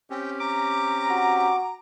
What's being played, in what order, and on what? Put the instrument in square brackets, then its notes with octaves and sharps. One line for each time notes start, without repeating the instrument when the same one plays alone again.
[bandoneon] C4 C#4 G4 [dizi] G5
[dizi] A#5 [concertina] D6
[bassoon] F#4